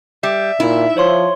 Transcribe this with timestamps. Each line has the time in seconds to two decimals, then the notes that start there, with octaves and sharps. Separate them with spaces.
0.23 G3 E5
0.60 A#2 D#4 E4
0.97 F3 C5 C#5 C6